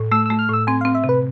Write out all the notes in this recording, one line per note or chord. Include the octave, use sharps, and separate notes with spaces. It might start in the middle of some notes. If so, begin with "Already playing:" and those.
Already playing: A2
A3 E6
A3 E6
F6
A2 E6
C4 G#5
C4 F5
E5
C3
B4